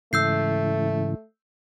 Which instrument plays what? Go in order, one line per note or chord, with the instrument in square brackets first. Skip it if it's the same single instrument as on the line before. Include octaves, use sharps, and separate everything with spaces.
[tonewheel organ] G#2 C#3 E3 [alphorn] A3 [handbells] E6 G6 C7